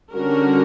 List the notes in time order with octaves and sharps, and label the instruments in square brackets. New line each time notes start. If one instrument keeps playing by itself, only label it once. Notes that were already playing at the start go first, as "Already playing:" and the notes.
[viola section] D3 G3 C#4 F#4 A#4